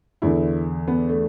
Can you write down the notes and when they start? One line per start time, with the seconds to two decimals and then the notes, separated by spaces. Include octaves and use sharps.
0.22 E2 D3 E4
0.88 B3
1.09 A3